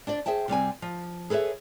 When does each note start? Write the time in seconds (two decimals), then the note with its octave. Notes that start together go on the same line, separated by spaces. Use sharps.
0.07 D4 C5 D5
0.26 G#4 C5 E5 G5 A5
0.48 C3 G3 C4 G#5
0.82 F3
1.30 G#4 A4 B4 C#5 E5